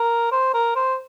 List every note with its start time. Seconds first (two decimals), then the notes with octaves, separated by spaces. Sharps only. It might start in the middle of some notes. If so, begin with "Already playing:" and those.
Already playing: A#4
0.32 C5
0.54 A#4
0.76 C5